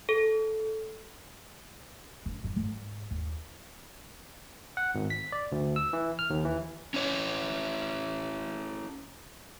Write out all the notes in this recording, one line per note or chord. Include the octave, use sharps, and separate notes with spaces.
A4
D3
G2
G#2
D#2
F#5
G#1
B6
D5
D2
E6
E3
F6
D#2
E3
C#4 E4 C#5